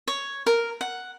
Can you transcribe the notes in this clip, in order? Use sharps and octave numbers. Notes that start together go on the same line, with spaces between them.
C#5
A#4
F#5